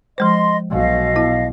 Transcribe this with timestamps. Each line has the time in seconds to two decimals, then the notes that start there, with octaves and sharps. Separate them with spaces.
0.18 F3 G#3 C5 D#5 C6
0.70 B1 B2 D#5 F5
1.16 B3 E4